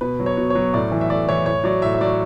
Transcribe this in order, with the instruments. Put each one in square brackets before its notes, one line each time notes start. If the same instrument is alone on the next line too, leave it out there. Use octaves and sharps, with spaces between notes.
[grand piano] B2 B4
F#3
C#5
B2
F#3 C#5
A2 D5
E3
E5
A2 D5
E3 C#5
A2 C#5
F#3 D5
A2 E5
E5
F#3 D5